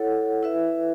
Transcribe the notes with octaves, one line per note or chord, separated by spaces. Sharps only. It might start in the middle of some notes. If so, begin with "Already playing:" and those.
Already playing: E4 A4 C#5 F#5
E4 B4 E5